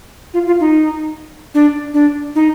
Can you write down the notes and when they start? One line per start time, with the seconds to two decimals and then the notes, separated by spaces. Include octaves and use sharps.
0.34 F4
0.47 F4
0.60 D#4
1.54 D4
1.94 D4
2.35 D#4